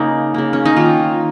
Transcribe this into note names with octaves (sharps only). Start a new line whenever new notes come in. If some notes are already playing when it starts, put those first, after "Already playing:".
Already playing: C#3 A#3 D#4 G#4
C#3 A#3
C#4
D#4
D#3 A#3 F4